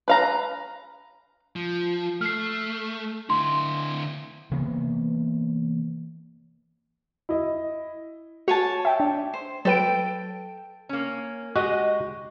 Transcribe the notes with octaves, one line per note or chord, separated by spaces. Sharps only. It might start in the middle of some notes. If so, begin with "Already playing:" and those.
B4 F5 A#5
F3
A3 F6 C7
D3 E4 C6
C3 E3 A#3 B3
E4 D#5
F#4 C#5 G#5 A5
E5 G5
D4
C5
F#3 A4 B4 G5 D7
A#3 C#4
G#3 F#4 G4 D#5